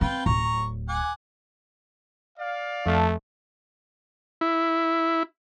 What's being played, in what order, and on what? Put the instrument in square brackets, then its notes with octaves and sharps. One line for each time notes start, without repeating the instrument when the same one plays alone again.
[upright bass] C4 [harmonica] F4 B4 G5
[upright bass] D1 [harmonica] A#5 C#6
[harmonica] F#5 G#5 D6
[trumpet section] D5 F5
[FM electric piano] F2 [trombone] A3 [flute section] A5
[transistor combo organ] E4